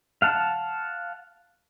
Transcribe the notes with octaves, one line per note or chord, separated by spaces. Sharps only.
F5 F#5 A5